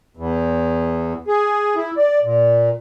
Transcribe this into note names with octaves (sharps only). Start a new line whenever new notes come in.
E2
G#4
E4
D5
A#2